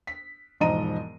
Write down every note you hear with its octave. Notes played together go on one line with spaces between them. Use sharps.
B6
E1 G#2 F3 D#5 A#5 D#7